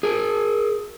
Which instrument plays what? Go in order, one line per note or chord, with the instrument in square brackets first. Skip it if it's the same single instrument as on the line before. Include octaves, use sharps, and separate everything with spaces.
[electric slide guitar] G#4 A#4